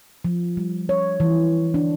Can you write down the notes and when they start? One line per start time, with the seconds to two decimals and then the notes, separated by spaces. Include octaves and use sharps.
0.25 F3
0.57 G3
0.89 C#5
1.20 E3
1.74 D4